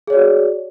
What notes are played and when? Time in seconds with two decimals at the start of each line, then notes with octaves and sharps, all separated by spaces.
0.07 G#4
0.10 C#5
0.13 D5
0.15 F#4